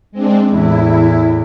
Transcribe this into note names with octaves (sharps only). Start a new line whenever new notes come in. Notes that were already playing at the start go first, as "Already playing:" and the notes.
G#3 C4 D4
E2 A2 E4